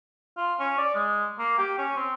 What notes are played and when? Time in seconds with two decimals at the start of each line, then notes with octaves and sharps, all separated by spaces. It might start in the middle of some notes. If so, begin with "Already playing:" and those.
0.37 F4
0.60 C#4
0.78 D5
0.95 G#3
1.39 A#3
1.58 G4
1.78 C#4
1.97 C4